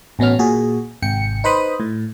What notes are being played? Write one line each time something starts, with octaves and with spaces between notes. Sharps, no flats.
A1 B2 B3 C#4 F6
A#2 F#4 G#4
G#1 C3 G5 C#7
D#4 B4 C5 B5 D#6
A2